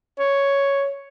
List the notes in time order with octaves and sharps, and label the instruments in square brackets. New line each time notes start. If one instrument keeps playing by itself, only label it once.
[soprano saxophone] C#5